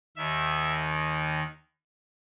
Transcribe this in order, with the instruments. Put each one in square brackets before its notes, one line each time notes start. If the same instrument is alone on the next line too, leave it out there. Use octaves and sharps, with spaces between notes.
[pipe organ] D#2 D#3 E5